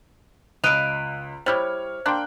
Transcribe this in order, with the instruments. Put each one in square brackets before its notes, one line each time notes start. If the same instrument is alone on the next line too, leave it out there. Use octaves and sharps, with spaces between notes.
[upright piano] C#2 B5 D7 [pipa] D#5 F5 [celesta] F#6 D#7 F7
[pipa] G3 E4 G4 [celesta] C5 [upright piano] C#5 F6
[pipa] A#3 D4 [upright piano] G5 C6 F#6